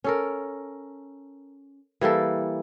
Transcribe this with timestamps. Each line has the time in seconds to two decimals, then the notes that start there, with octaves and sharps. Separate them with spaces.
0.04 C#4 A4 A#4
2.01 E3 G3 A#3 A4